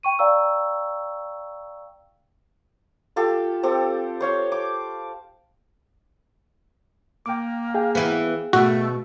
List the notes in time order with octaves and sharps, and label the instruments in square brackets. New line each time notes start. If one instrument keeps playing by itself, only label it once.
[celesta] G5 C#6 D#7
D5 F5 G5 A#5 C#6 E6
[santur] F4 G4 A4 F5
C4 G4 A4
C5 C#5 F5
D6
[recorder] A#3 [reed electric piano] G5 D6
[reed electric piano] G#4 F5 G5
[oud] E3 B3
[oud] B2 [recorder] A3 [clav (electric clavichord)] F#4